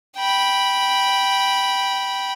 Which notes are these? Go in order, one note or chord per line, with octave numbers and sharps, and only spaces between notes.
G5 B5